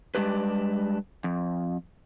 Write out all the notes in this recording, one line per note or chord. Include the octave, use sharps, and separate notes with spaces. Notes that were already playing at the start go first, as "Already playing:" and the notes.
G3 G#3 D4 G4 B4
F2